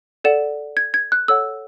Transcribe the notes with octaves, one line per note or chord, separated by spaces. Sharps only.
A4 D5 F#5 E7
G#6
G#6
F#6
A4 C#5 F#5 E6